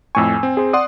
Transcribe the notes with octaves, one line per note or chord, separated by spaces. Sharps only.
F2 A2 G#5 C#6 E6
C4
G#4 C5
D5 F#5 C6 D#6